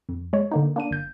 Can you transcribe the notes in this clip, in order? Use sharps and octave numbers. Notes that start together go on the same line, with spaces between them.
F2
G#3 C#5
D3 A#3 D#4
A#3 D4 D#7
G1 G6